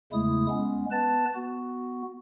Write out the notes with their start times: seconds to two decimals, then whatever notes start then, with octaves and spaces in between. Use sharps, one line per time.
0.13 E2 C#3 G#3 A3 E4 D#6
0.50 G#3 B3 C#4
0.91 B3 B4 A5 A6
1.35 B3 F#4